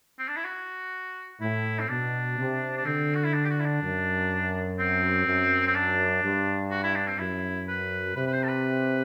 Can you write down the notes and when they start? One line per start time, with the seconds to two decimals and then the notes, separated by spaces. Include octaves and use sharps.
0.19 C4
0.28 D4
0.36 E4
0.45 F#4
1.41 A2 E4
1.80 C4
1.89 B2 D4
2.38 C3
2.77 D4
2.85 D3 C4
3.15 F#4
3.24 E4
3.34 D4
3.45 G4
3.50 F#4
3.60 E4
3.65 D4
3.82 F#2
4.79 C4
5.26 F#2
5.67 C4
5.75 D4
6.23 G2
6.71 F#4
6.84 E4
6.96 D4
7.07 C4
7.19 F#2 E4
7.68 B4
8.16 C3 B4
8.27 B4
8.32 C5
8.43 A4
8.48 B4